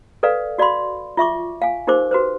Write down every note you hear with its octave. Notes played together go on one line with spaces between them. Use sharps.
A4 B4 D5 F5
F#4 D5 F5 B5 C6
F4 E5 C#6 D6
F5 G#5
D#4 G4 A#4 C5 D6
F#4 B4 C5